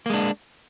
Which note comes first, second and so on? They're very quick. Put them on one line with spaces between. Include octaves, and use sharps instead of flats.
A#3 G#3 D4